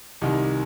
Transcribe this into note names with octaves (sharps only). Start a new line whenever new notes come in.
C2 C3 D#3 D#4